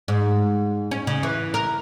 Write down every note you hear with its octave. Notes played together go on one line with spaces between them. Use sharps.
G#2
C#4
C#3
E3
A#4